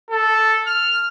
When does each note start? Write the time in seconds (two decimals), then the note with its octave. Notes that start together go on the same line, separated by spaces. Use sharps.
0.11 A4
0.67 F6